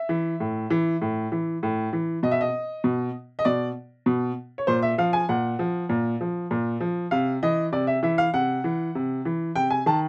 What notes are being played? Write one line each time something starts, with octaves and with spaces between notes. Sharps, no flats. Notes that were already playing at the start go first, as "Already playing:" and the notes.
Already playing: E5
E3
A2
E3
A2
E3
A2
E3
B2 D#5
E5
D#5
B2
D#5
B2 D5
B2
C#5
A#2 C5
E5
F3 F5
G#5
A#2 F#5
F3
A#2
F3
A#2
F3
C3 F5
E3 D#5
C3 D5
E5
E3 E5
F5
C3 F#5
E3
C3
E3
C3 G5
G#5
D#3 A5